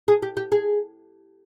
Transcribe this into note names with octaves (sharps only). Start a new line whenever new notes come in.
G#4
G4
G4
G#4